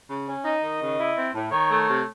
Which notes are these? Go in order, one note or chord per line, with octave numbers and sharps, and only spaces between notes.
C#3
C#4
D#4 D#5
D#3
C#3
E4
C4
A2
D#3 C#5
A3
C3